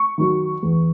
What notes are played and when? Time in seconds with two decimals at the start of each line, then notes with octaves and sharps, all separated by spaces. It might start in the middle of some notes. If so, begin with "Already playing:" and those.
Already playing: C#6
0.18 D#3 F#3
0.63 E2